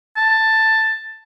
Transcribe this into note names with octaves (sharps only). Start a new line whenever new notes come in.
A5